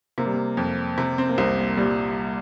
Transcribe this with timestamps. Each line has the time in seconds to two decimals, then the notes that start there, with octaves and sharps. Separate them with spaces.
0.18 C3 A#3
0.25 G3
0.34 A#3
0.57 F2
0.98 C3 C4
1.18 C4
1.29 A#3
1.38 C2 C4
1.58 A#3
1.77 A#2 G3